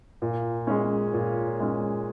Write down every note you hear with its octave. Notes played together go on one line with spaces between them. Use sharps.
A#2
G#3 C#4
A#2
G#3 C#4